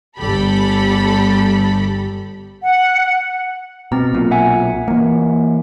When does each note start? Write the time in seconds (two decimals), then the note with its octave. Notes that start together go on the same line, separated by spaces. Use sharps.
0.17 G1 G4 A4 B5
2.64 F#5
3.92 B2 C4 A#5
4.13 B1 A#2
4.31 E5 F#5 G#5
4.88 E3 A#3